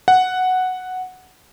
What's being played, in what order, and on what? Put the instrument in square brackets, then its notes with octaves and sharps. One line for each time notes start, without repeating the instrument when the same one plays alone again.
[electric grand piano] F#5